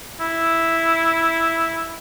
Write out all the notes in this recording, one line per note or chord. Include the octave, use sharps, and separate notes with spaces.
E4